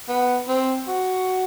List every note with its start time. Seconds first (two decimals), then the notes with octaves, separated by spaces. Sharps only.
0.09 B3
0.48 C4
0.88 F#4